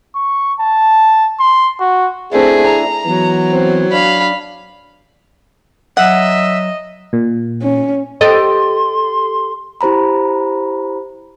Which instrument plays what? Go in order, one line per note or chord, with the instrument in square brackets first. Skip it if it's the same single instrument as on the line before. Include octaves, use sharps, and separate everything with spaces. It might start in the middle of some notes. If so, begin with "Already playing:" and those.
[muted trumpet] C#6
A5
C6
F#4
[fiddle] A3 C4 [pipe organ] D4 E4 [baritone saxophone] G#4
[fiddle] A#5
[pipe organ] E3 B3 [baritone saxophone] F#3
[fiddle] C4
[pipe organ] D4 [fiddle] F5 B5
[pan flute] F#3 [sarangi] D#5 [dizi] E5 [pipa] F#5
[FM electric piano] A#2
[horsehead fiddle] C#4
[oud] G4 A4 D#5 [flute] C6
[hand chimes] E4 G4 C5 A#5 B5